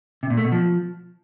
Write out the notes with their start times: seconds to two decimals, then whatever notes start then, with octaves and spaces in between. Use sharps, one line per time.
0.23 C3
0.30 A#2
0.37 A3
0.45 B2
0.52 F3